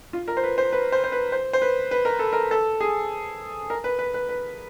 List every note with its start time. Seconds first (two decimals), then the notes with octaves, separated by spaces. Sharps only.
0.13 F4
0.28 A#4
0.37 C5
0.43 B4
0.58 C5
0.73 B4
0.92 C5
1.04 C5
1.12 B4
1.32 C5
1.53 C5
1.62 B4
1.91 B4
2.05 A#4
2.19 A4
2.33 A#4
2.51 A4
2.80 G#4
3.70 A#4
3.84 B4
3.99 B4
4.14 B4
4.29 B4